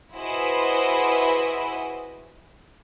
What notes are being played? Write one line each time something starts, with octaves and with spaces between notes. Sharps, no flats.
E4 F#4 G#4 B4 C5 D#5